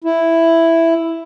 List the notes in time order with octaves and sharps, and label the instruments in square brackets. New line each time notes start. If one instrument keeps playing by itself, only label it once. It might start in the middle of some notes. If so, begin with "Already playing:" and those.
[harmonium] E4